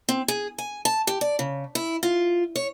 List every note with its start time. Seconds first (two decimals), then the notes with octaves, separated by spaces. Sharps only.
0.09 C4
0.28 G#4
0.58 G#5
0.85 A5
1.07 G4
1.21 D5
1.39 C#3
1.75 E4
2.03 F4
2.56 C#5